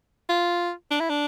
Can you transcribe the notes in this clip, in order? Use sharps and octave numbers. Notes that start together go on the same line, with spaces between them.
F4
D4
E4
D4